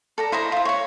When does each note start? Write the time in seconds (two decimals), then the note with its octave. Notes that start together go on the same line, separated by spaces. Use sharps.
0.18 A4 D5 A#5
0.32 E4 C5 D#5 A#5
0.52 F4 E5
0.65 C#5 C#6